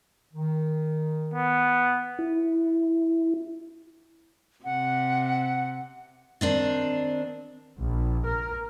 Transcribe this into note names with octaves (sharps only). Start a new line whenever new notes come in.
D#3
B3
E4
C3 F#5
D#3 C4 D4
A#1
A#4